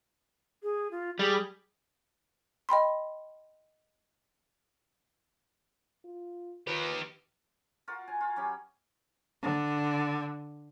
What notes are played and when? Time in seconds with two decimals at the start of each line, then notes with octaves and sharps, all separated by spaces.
0.63 G#4
0.91 F4
1.19 G3 G#4
2.69 D#5 G5 B5 C6
6.05 F4
6.67 D#3 F4 G4 B4
7.88 F4 F#4 A#4
8.08 G#5
8.21 F4
8.36 F#3 C#4 G4 B5
9.43 D3